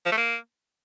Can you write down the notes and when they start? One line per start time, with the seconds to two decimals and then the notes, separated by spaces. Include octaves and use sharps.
0.06 F3
0.12 A3
0.17 A#3